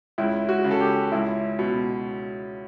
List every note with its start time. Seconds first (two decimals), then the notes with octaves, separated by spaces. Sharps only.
0.18 C#2 E4
0.49 F#4
0.64 C#3
0.71 A4
0.80 G4
1.12 C#2 E4
1.59 B2